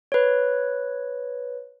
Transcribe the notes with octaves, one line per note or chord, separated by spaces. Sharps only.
B4 C#5